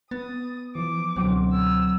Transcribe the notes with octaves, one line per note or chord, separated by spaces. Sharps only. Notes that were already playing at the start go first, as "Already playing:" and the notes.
B3 D#6 A6
E3 F3 D6
C#2 B2 D3 F#3 C4
E6